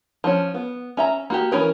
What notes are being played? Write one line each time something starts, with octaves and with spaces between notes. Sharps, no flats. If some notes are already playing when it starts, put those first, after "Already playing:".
F3 C#4
B3
C#4 E5 A#5
A#3 F#4 G4
E3 A3 C#4 A#4 B4